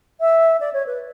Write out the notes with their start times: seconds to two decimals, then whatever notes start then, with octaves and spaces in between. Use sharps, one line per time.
0.20 E5
0.60 D5
0.73 C#5
0.86 B4